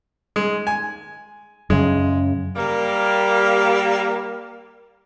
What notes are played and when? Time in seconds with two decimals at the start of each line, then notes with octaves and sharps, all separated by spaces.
0.36 G#3
0.67 G#5
1.70 F#2 C#3 G#3
2.56 G3 A#3